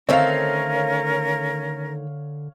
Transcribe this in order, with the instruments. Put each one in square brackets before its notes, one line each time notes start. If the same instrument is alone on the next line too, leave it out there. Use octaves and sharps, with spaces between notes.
[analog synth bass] D3 [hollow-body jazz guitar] D#3 A3 C4 [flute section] C#4 A#4 [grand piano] C#5 F5